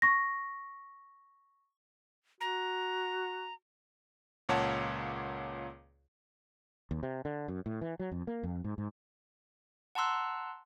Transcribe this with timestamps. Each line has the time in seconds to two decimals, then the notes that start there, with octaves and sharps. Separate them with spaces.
0.02 C#6 A#6
2.41 F#4 A#5
4.49 C#2 A#2 C#5 F#5 A5
6.91 D#2
7.03 C3
7.25 D3
7.48 F#2
7.66 A2
7.81 E3
7.99 F#3
8.12 F2
8.27 A#3
8.43 F2
8.64 G#2
8.78 G#2
9.95 F#5 A5 A#5 C6 E6 F#6